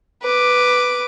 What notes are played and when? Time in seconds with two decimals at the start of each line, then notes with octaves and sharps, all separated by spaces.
0.22 B4 D6